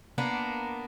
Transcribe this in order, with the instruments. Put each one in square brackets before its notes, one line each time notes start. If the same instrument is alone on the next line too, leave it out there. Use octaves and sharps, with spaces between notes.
[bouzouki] A#3 B3 D4